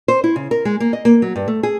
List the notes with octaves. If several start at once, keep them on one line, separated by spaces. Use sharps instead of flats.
C5
E4
C#3
A#4
G#3
A#3
D#5
A#3
F#3
G2
A3
G#4